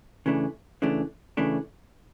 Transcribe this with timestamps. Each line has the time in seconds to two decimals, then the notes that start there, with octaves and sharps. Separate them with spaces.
0.26 C#3 E3 A3 D4
0.82 C#3 E3 A3 D4
1.37 C#3 E3 A3 D4